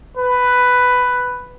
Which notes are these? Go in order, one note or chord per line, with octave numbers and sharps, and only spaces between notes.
B4